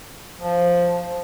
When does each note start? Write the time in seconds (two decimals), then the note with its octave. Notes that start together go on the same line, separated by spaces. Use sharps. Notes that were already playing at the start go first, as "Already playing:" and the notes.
0.42 F3